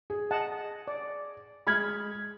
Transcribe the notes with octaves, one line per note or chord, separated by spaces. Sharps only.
G#4
D#5 F#5 A5
D5
G#3 B5 F6 G#6